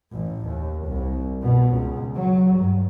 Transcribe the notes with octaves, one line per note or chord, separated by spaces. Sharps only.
A1
D#2
C2
B2
C#2
F#3
G2